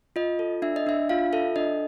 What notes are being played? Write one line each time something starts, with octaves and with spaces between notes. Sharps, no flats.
F4 D#5
A4
D4 E5
D#5
D4 E5
F4 F5
A4 E5
D4 D#5